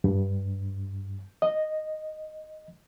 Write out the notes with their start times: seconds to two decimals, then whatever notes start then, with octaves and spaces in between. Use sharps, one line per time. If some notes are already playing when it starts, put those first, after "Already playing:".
0.04 G2
1.42 D#5